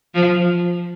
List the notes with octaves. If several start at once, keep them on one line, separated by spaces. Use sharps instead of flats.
F3